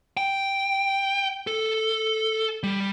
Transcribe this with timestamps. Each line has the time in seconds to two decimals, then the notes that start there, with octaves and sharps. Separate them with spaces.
0.17 G5
1.47 A4
2.63 G3